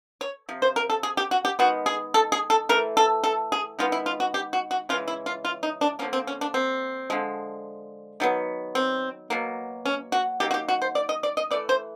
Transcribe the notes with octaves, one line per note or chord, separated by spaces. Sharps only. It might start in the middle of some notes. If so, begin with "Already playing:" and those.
C#5
C3 F3
C5
A#4
A4
G#4
G4
F#4
G4
D#3 G#3 B3 F#4
G#4
A4
G#4
A4
E3 A3 A#4
A4
A4
G#4
D#3 G#3 B3 F4
E4
F4
F#4
G4
F#4
F#4
C#3 E3 G#3 F4
E4
F4
F4
D#4
D4
D3 F3 A#3 C#4
C4
C#4
D4
C4
D3 F3 G#3
D#3 F#3 B3
C4
B2 F#3 A#3
C#4
F#4
D#3 F#3 A#3 G4
F#4
G4
F#4
C5
D5
D#5
D5
D#5
E3 A3 D5
C5